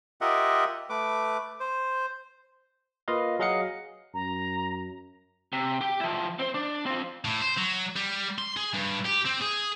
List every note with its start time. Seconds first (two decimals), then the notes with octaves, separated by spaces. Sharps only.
0.21 F4 G4 A#4 D#5 E5 F#5
0.90 A3 B4 D6
1.60 C5
3.08 A#3 F4 B4 D#5 F5
3.39 F#3 G#4 D#5 F5 F#5 C#7
4.14 F#2 A#5
5.53 C3
5.81 G4 G5
6.00 F3 E4
6.39 C4 C5
6.54 D4
6.86 C4 F4
7.25 A2
7.42 C5
7.58 F#3
7.96 G3
8.38 C6
8.57 G#4
8.74 G2
9.06 G4
9.26 C4
9.42 G#4